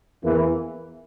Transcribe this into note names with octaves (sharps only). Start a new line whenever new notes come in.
E2 E3 A#3